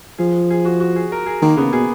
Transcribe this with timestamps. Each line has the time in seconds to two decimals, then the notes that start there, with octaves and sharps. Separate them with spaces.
0.18 F3 G#4
0.50 G#4
0.65 F#4
0.80 F#4
0.96 G#4
1.12 A#4
1.26 G#4
1.42 D#3 A#3
1.57 C#3 B3
1.73 B2 G#4